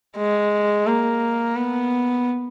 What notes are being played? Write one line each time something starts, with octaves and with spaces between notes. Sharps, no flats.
G#3
A#3
B3